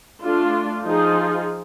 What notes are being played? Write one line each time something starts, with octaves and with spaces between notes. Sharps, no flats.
A3 D4 F4
F3 D#4 F4 G#4